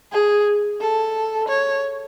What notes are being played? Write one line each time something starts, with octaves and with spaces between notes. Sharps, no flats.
G#4
A4
C#5